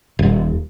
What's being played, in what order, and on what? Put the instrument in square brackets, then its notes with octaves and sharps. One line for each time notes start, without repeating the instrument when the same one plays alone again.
[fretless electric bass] D#1